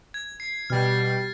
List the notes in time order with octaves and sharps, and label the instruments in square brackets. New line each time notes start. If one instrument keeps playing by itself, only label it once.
[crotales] G#6
C7
[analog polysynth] B2 G3 [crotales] F6 A6